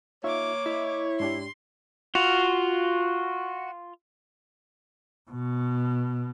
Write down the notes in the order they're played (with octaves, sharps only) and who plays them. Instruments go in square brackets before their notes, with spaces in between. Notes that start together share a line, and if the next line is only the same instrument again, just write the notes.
[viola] A#3 D6 [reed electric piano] D#4 F4 E5 [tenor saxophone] C#5
[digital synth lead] E4 [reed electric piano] D#5
[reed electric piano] G#2 D4 G4 [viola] C6
[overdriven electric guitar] F4 [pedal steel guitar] F#4
[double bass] B2